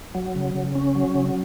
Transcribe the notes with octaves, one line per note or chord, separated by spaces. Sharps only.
F#3
C#3
C#3
C#4
F#3
C#3